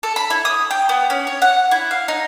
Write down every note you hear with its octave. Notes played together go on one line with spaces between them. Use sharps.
A4
B5
E4
D#6
G5
B3
C#4
C#5
F#5
E4
F5
D#4